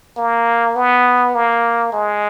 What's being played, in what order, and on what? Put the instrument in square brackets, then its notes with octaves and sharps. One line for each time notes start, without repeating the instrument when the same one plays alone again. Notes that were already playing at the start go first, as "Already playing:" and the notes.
[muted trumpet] A#3
B3
A#3
G#3